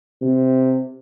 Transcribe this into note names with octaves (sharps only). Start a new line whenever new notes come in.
C3